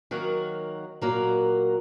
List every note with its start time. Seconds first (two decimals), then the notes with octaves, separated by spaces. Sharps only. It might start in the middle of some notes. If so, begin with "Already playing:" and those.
0.11 D#3 F#3 A#3 F#4 A#4
1.01 A#2 F#3 A#3 F#4 A#4